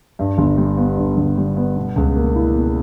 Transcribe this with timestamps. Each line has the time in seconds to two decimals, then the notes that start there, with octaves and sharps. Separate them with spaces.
0.19 G2
0.38 G1
0.57 G3
0.78 B3
0.97 G2
1.17 G1
1.37 G3
1.57 B3
1.77 B2
1.96 C#2
2.16 A#3
2.36 E4
2.55 B2